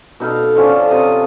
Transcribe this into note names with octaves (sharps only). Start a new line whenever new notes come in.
B2 D#4 A4 F5
D3 F3 C#4
C3 D#5